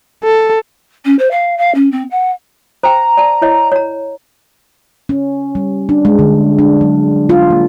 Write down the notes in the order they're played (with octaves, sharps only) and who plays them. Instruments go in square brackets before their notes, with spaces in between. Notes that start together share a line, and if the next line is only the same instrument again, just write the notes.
[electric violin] A4
[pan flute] C#4
C5
F5
F5
C#4
C4
F#5
[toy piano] C5 G5 [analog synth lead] A#5
[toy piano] D5 A5
E4 C#5 D#5
C#5 A#5
[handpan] C#4
G3
D4
G#3
D3
D4
F#3
F4
A#3